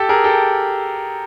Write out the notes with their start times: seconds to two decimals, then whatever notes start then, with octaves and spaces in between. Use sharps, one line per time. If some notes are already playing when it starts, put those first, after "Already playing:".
Already playing: G4 A4
0.09 G#4 A#4
0.24 G4 A4